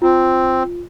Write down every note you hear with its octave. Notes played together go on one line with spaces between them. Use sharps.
C4 F4